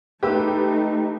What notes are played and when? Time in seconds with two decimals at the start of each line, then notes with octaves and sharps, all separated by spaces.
0.23 A3 D#4 G4 B4 E6